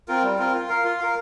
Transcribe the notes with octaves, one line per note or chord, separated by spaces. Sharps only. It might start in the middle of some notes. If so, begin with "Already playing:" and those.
C4 F4 A#4
G3
C4 F4 A#4
F4
A#4 F5
F4
A#4 F5